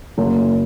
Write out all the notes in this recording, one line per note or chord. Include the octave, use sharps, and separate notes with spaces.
F#1